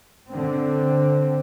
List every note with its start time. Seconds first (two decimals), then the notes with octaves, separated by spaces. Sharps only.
0.29 D3 C4